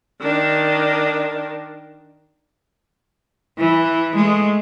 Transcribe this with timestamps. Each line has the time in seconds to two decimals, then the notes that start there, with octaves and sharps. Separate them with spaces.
0.21 D#3 D4
3.58 E3
4.16 G#3 A3